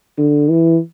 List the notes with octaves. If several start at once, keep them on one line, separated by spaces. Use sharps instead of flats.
D3
E3